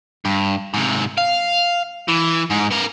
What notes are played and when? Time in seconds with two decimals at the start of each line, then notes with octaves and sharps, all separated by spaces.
0.25 G2
0.74 G#2 C3
1.18 F5
2.08 E3
2.51 G#2
2.71 B3 A#4